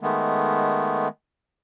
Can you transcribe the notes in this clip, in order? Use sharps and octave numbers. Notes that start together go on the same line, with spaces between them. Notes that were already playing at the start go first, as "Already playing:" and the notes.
D#3 G#3 A3 B3